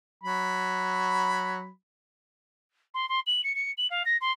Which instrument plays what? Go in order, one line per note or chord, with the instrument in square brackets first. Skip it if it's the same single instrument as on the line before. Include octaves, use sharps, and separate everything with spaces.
[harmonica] F#3 B5
[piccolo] C6
C6
F#7
C#7
C#7
F#7
F5
A#6
C6